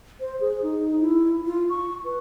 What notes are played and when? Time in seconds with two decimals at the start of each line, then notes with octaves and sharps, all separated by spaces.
0.20 C5
0.41 G#4
0.62 D#4
1.00 E4
1.46 F4
1.70 C#6
2.05 B4